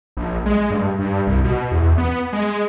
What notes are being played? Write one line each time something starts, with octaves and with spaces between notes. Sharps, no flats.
A#1
G#3
G2
G2
C2
B2
E2
B3
G#3